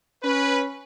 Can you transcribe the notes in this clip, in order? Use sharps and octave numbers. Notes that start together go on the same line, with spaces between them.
C#4 B4